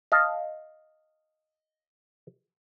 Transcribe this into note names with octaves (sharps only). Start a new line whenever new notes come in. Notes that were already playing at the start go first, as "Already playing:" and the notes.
D#5 F5 A5